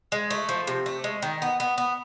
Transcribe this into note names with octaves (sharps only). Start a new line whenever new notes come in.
G#3
A3
F3
C3
A3
G#3
D#3
B3
B3
B3